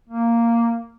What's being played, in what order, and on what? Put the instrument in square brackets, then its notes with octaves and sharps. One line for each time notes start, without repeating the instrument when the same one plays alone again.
[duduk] A#3